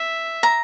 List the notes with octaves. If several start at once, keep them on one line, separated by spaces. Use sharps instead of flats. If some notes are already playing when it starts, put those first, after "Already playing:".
Already playing: E5
A#5